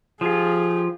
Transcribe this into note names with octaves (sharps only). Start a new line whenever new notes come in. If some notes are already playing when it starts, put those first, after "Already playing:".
F3 F4 G4 G#4